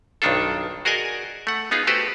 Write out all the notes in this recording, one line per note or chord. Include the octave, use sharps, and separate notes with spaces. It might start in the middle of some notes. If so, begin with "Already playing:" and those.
B1 G2 D#3 D4 F4 A4
F#4 G#4 A#4 D5 D#5 G#5
A3 F#5
B3 D#4 F4 G#4
A3 F#4 G4 B4 C5 F#5